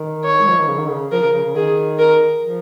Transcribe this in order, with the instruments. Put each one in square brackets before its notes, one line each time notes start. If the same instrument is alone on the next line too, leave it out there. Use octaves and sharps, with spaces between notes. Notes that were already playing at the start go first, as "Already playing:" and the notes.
Already playing: [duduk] D#3
[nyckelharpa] C#5
[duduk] G#3
F3
D#3
C#3
D#3
C#3
[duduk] F3 [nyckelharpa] A#4
[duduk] C#3
C#3
C#3
[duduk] D#3 [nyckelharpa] G#4
[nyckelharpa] A#4
[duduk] F3